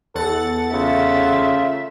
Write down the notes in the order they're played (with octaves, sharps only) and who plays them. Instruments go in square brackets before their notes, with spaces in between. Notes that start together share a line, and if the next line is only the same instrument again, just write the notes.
[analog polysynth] E2 F#5 A6 [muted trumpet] A4
[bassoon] C#3 [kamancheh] A3 E5 [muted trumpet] F4